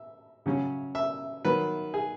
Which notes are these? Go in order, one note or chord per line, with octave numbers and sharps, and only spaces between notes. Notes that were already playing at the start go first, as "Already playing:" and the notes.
Already playing: E5
C#3 F#3 C#4
E5
D#3 F#3 B3 B4
G#4